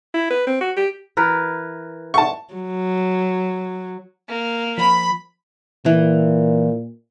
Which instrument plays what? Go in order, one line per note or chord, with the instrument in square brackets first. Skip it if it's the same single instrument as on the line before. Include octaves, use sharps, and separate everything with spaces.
[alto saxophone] E4
B4
C4
F#4
G4
[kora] E3 A#4 B4
[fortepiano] A5 C#6
[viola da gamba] F#3
[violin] A#3
[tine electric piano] F3 [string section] B5
[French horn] A#2 [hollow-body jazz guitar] E3